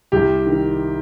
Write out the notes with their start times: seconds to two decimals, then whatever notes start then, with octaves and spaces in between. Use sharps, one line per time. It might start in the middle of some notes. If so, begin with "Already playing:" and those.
0.12 C2 G4
0.46 D#3